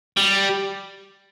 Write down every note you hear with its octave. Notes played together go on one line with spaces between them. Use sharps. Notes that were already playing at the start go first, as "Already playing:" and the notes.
G3